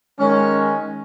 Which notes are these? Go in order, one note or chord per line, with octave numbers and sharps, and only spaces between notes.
D#3 G#3 C#4